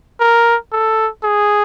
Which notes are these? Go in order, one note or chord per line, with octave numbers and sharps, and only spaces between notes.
A#4
A4
G#4